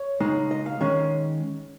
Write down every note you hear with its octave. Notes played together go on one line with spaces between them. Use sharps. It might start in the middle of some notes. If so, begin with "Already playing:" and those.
Already playing: C#5
C#3 G#3 D#4
D#5
F5
D#3 G#3 C#4